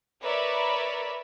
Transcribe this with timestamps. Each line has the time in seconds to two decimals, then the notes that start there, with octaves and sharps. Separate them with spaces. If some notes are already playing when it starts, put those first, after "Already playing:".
0.21 A#4 B4 C#5 D5 E5 B5